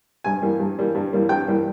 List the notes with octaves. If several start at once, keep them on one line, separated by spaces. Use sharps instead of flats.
G2 G#5
E3 G3 A#3
G2
E3 G3 A#3
G2
E3 G3 A#3
G2 G5
E3 G3 A#3